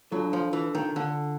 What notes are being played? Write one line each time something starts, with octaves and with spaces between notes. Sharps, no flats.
F#3 D4 F4 A4
F3
E3
D#3
D3